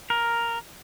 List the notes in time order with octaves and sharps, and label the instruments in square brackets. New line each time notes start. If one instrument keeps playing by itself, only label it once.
[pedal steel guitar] A#4